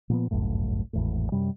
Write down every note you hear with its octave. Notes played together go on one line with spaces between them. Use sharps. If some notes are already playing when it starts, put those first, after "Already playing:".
A#2 F3 B3
G1 C#2 F#2 A2
G#1 E2 A2
F#2 C3 G3